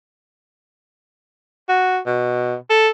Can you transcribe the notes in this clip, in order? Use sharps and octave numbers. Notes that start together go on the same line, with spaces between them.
F#4
B2
A4